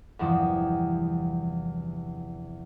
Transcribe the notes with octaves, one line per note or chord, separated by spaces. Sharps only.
E2 G2 C3 E3 F3